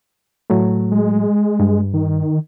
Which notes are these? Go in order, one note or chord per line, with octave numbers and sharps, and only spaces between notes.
A2 F#3 A3
G#3
G2
D#3